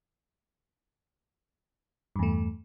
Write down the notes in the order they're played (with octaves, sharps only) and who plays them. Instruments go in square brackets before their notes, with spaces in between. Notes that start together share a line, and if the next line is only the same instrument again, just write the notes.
[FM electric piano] G2
E2
A3